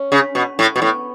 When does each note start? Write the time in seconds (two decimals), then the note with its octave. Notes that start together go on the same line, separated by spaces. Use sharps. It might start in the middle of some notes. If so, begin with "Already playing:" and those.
Already playing: C#4
0.12 C#3
0.35 B2
0.59 A2
0.76 B2
0.82 A2 B3